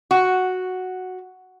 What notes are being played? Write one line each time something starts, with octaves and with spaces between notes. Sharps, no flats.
F#4